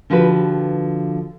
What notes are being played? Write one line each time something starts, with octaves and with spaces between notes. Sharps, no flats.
D3 F3 F#4 G4 B4